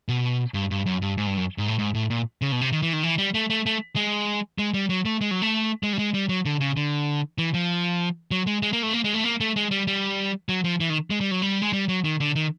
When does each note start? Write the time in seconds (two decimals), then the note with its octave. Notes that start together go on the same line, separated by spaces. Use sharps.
0.09 B2
0.54 G2
0.71 G2
0.86 F#2
1.02 G2
1.18 G#2
1.27 G2
1.37 F#2
1.58 G#2
1.68 A2
1.78 G#2
1.95 A2
2.10 A#2
2.42 C#3
2.52 B2
2.61 C3
2.72 D#3
2.82 E3
2.93 D#3
3.03 E3
3.18 G3
3.34 A3
3.50 A3
3.66 A3
3.96 G#3
4.58 G#3
4.74 G3
4.89 F#3
5.05 A3
5.21 G#3
5.31 F#3
5.42 A3
5.83 G#3
5.93 G3
5.99 G#3
6.14 G3
6.29 F#3
6.45 D3
6.60 C#3
6.77 D3
7.38 E3
7.54 F3
8.31 F#3
8.46 G#3
8.62 G#3
8.73 A#3
8.83 A3
8.93 A#3
9.04 G#3
9.14 A3
9.24 A#3
9.40 A3
9.56 G#3
9.71 G3
9.87 G3
10.49 F#3
10.64 F3
10.80 E3
10.90 D#3
11.10 G#3
11.21 G3
11.31 F#3
11.42 G3
11.62 G#3
11.73 G3
11.88 F#3
12.05 D#3
12.20 D3
12.36 D#3